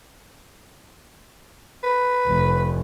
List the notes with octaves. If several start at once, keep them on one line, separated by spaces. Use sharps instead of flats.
B4
F1